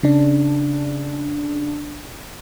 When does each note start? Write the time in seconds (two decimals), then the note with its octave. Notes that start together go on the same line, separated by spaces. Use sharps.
0.03 C#3 D4